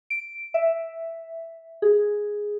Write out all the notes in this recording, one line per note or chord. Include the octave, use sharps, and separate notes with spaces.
D7
E5
G#4